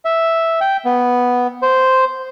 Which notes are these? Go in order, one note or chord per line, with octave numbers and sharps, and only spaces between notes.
E5
G5
B3
C5